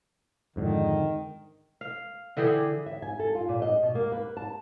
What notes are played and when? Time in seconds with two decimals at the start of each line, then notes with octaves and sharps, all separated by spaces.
0.56 F2 G#2 D3 D#3
1.81 F5
2.37 D3 E3 G4 G#4
2.86 E5
3.02 G#5
3.19 A4
3.35 F4
3.49 A#2
3.62 D#5
3.82 B2
3.95 A#3
4.12 B4
4.37 A5